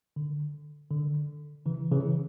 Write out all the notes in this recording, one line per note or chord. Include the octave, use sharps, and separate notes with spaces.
D3
D3
C#3 E3
C#3 E3